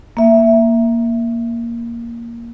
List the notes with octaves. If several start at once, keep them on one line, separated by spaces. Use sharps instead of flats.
A#3 E5